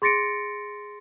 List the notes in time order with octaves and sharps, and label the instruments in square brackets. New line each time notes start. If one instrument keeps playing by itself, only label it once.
[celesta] G#4 C6 A6 A#6 C#7 D7